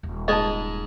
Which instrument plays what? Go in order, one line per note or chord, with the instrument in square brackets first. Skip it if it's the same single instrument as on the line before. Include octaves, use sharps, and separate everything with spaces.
[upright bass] D#1
[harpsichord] G#2 G#3 G#5 [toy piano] D#5 A5